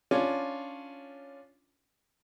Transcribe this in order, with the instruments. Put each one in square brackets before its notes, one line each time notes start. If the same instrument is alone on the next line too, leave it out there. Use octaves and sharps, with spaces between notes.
[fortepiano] C#4 D4 F4